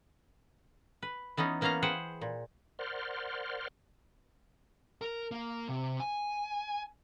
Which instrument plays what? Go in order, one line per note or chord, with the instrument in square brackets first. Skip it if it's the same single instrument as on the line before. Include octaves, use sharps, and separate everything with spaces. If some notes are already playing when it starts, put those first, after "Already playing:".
[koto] B4
E3 B3 C#4 D#4
E3 A#3 B3 C#4 F5 A#5
G#4 B4 C5 F#5 G5
A#2
[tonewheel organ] A#4 C5 D5 F#5 C6 F6
[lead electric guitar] A#4
A#3
C3
G#5